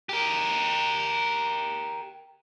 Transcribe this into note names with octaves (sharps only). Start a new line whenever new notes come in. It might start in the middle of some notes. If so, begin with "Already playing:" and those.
G4 A#4